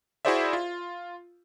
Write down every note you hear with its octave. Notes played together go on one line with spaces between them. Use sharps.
E4 F#4 G#4 C5 D5 E5
F4